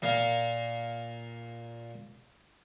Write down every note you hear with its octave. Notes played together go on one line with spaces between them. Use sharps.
A#2 A#3 F5